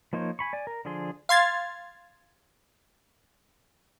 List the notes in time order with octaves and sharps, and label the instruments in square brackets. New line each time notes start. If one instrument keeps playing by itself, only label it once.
[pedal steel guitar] F3 A#3 D#4 C5 C#5
G#5 B5 C#6
D5 G#5
A#4
D3 F3 D4 G#4 C6
[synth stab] F5 C6 G#6 A6